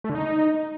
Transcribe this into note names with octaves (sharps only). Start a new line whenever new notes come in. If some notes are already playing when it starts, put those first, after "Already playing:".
A3
D3
D#4